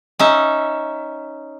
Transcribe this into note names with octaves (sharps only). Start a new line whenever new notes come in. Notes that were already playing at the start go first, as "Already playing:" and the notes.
C#4 D#4 E5